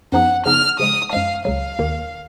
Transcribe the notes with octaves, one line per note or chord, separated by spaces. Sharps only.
F#2 F3 B3 D#4 G#4 F#5
C#3 F3 B3 D#4 G#4 F6
C#3 F3 G#3 D#6
F#2 F3 G#3 F5
C#2 C#3 F#3 F5
D#2 D#3 A#3